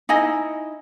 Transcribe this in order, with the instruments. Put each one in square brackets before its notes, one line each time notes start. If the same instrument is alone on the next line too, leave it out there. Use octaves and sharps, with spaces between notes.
[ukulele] D#4 E4 D#5 G#5